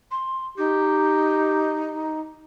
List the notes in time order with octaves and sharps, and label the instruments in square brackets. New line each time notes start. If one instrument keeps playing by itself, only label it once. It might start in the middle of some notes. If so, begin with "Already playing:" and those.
[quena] C6
[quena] D#4 [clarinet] G4